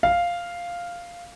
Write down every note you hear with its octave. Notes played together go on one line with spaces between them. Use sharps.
F5